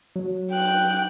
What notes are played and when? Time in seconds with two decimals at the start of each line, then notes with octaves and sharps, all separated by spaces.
0.16 F#3
0.52 G5 F#6